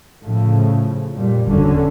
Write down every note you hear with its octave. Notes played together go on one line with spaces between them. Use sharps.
A2 C#3 F3
F2 A#2 G3
F#1 E2 D3 F#3 C#4